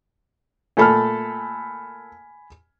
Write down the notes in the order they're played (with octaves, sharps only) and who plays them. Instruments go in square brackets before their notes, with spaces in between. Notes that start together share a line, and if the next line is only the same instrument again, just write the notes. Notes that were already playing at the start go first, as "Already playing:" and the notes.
[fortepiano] A#2 A3 A4 [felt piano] G#5 B5 F6